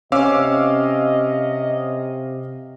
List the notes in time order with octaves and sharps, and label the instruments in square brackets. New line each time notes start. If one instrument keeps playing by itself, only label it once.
[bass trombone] C3 [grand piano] C#4 [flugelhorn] D#5 [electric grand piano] F5 D6 E6